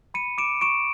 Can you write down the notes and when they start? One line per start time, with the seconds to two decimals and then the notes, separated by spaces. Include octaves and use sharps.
0.14 B5 C#7 D#7
0.38 D6 D7 E7
0.61 C#6 D7 E7